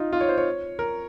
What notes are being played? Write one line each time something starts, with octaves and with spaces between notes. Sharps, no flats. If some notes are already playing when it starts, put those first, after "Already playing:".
Already playing: D#4 F4
F4
C#5
C5
C#5
A#4